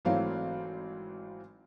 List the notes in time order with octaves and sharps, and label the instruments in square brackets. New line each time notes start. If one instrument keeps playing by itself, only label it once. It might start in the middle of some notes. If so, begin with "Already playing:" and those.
[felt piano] G#1 E3 F#3 A3 C4 F5